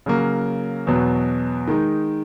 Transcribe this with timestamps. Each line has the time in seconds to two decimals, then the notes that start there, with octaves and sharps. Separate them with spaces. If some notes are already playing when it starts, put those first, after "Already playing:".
0.06 C#3 F#3 A#3
0.87 E2 B2 F#3 B3
1.68 D#3 G#3 D#4